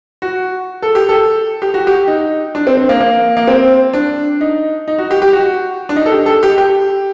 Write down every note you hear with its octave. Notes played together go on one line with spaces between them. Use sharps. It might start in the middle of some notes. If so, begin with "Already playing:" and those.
F#4
A4
G4
A4
G4
F#4
G4
D#4
D4
C4
C4
A#3
A#3
A#3
C4
D4
D#4
D#4
F#4
G4
G4
F#4
D4
D#4
A4
G4
A4
G4
G4